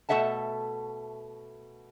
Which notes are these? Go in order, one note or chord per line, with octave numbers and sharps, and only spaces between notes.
B2 A3 A4 E5 F#5 A5